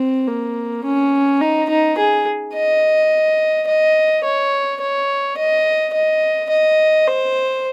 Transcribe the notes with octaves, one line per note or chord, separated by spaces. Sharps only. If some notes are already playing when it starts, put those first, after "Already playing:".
Already playing: C4
A#3
C#4
D#4
D#4
G#4
D#5
D#5
C#5
C#5
D#5
D#5
D#5
C5